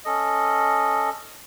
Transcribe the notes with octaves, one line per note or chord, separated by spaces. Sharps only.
C#4 A4 D#5